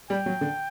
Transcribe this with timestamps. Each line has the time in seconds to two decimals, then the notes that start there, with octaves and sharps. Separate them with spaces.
0.10 G3 G5
0.26 F#3
0.41 D3